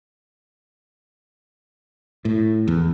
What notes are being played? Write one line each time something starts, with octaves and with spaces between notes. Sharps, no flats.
A2
E2